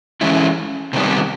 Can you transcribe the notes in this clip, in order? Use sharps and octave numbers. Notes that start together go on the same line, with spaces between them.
E3 G#3 C#4 E4
C3 D#3 G3 B3